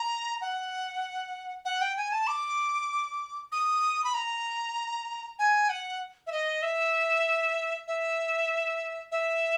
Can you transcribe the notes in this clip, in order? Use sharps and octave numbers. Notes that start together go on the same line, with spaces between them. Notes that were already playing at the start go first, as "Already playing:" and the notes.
Already playing: A#5
F#5
F#5
G5
G#5
A5
D6
D#6
B5
A#5
G#5
F#5
E5
D#5
E5
E5
E5